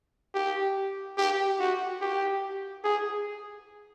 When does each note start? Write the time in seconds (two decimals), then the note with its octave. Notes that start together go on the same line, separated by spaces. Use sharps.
0.35 G4
1.18 G4
1.60 F#4
2.01 G4
2.84 G#4